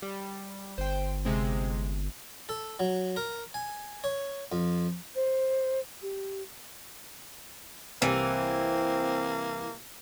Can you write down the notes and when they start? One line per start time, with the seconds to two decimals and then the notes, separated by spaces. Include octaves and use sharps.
0.02 G3
0.78 G1 C5 G5
1.25 C3 G#3 C4
2.49 A4
2.79 F#3
3.16 A#4
3.54 G#5
4.04 C#5
4.52 F2
5.15 C5
6.02 G4
8.02 C2 C3 E3 A#3 C4